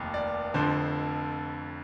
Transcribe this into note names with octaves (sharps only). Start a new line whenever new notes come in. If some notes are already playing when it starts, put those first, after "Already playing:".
Already playing: F1 D#2
D5
F1 F2 D3 F3 C5